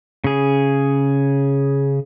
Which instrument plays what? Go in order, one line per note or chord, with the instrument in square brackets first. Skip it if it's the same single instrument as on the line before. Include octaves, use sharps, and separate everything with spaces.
[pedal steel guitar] C#3 G#4